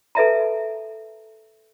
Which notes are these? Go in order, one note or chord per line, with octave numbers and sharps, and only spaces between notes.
A4 B4 D#5 E5 A5 A#5